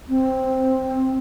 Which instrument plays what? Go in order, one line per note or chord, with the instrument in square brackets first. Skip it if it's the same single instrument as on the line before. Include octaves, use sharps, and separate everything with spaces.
[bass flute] C4